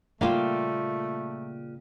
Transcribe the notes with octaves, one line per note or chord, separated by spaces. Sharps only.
A#2 C#3 G3 A3 A#3 F4